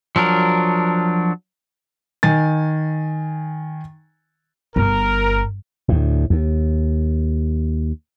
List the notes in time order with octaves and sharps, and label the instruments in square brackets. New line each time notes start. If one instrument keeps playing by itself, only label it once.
[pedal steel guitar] F3 F#3 D4 A#4
[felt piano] D#3 G#5 A6
[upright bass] G1 [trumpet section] A#4
[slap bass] D2 A2
D#2